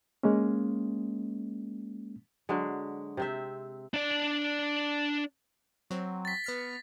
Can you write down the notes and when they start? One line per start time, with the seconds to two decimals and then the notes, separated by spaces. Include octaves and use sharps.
0.23 G#3 A#3 C#4
2.49 D3 F#3 G#3
3.17 C3 C4 E5
3.94 D4 D5
5.91 F#3 C4
6.25 A6 B6
6.44 B3 F6 C#7